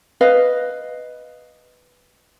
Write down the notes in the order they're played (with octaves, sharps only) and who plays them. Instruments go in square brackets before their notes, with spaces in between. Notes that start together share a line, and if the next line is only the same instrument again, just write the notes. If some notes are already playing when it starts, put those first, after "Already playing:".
[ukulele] B4 D#5 F5